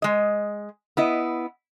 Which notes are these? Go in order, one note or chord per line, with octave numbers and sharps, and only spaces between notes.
G#3 D#5
B3 E4 D#5